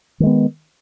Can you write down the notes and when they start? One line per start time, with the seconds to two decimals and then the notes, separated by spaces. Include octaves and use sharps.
0.20 D#3
0.23 G#3
0.27 B3